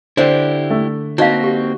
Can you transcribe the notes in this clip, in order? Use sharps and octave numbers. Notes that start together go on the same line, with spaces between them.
D3 D4 E4 G4 C5
A3
A#3 C4 D#4 F#4 D#5 F5
G4